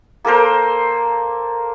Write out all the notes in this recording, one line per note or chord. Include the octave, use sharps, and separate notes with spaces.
A#3 A4 A#4 C5